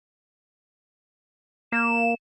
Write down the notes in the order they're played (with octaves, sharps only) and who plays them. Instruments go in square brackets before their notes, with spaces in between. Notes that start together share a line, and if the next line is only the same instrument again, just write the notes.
[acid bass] A#3 [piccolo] E7